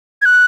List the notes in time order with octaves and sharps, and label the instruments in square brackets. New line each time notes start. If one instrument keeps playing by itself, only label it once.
[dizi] G#6
F#6